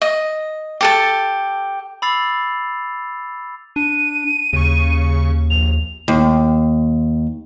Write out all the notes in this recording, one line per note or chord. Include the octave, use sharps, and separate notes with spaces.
D#5
G4 A4 A5
B5 D6 E6 A6 C7 F7
D4 D#7
D#2 C#3 C#6
A#1 F7
D#2